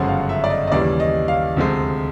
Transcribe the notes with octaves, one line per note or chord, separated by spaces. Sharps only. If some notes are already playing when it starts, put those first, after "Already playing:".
Already playing: G1 F#2 C#3 F3 G#3 F#5
F5
E5
D5
D#5
D#5
D#2 C#3 E3 G3 D5
D#5
F5
D2 C3 F3 G#3